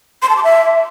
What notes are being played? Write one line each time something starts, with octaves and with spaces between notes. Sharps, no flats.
C6
A5
D6
E5